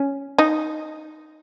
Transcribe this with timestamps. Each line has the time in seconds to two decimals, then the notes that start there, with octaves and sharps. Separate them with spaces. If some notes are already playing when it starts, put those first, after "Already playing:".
Already playing: C#4
0.39 D#4